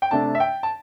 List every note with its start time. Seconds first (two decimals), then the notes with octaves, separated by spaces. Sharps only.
0.02 G5
0.11 C3 A3 D4 A5
0.35 E5
0.40 G5
0.63 A5